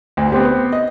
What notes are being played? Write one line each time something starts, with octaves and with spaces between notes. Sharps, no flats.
D2
B3 C4 G4
D#5